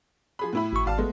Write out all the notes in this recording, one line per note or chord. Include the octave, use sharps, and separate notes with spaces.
F3 G#4 B5
A2 E4 B5
G#1 C#6
G#1 D5 F5 A5
G#3 A3 B3